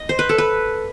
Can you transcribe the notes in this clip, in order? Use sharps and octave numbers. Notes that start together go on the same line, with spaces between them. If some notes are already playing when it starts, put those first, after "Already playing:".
Already playing: D#5
C5
B4
A4
B4